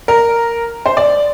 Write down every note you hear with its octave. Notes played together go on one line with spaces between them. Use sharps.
A#4
C5
D5